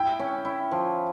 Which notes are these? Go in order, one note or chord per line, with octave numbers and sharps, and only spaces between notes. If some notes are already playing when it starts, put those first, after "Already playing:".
Already playing: E4 G5
C#4
E4
F3